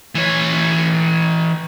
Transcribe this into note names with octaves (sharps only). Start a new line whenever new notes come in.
E3 C#5